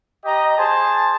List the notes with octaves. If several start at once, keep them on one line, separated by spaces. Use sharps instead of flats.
G4 D#5 A#5
G#4 C5 A5